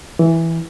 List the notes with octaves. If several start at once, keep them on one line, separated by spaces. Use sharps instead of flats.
E3